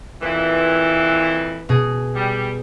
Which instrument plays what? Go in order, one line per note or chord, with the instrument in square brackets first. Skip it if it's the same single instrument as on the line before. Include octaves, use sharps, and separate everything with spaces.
[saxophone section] F2 A#2 E3 [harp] B4
[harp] B2 G#4
[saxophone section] G3